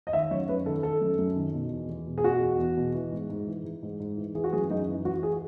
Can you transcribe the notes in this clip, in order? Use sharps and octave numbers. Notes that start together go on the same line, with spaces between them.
D#5
D#3 E5
F#2 C#5
F#2 B4
D#3 A4
D#3 A4
F#2
F#2
D#3
B2
E2
E2
B2
G#4
B2 F#4
E2
E2
B2
E3
G#2
G#2
E3
E3
G#2
G#2
E3
E3 G#4
F#4
F#2 G#4
F#2 D#4
E3
E3 F#4
G#4